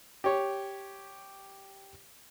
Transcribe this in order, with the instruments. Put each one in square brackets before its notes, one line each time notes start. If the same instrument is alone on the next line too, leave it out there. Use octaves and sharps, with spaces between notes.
[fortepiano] G4 C#5